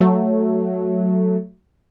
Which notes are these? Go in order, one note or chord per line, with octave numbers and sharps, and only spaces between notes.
F#3 A3